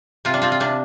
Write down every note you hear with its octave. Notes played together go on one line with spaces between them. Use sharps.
C3 F4
D4
C4 F4
F4
C3 D4